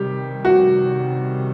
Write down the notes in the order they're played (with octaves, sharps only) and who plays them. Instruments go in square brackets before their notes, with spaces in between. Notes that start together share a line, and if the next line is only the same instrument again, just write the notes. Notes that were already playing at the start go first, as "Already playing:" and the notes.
Already playing: [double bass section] C3 D#3 G3 [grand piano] G4
[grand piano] F#4